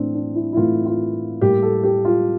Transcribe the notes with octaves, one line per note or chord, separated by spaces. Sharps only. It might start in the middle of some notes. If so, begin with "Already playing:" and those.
Already playing: A2 E3 A3 C4 D4
D4
E4
E4
A2 E3 A3 F4
F4
A2 G3 A#3 G4
A4
G4
F4